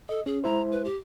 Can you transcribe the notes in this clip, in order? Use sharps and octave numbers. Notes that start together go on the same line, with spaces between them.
A4 D#5
C#4 G#4
G#3 E4 C5 A#5
B4
G4